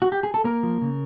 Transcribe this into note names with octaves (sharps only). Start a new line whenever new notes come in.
F#4
G4
G#4
A4
A#3 A#4
F3
C#3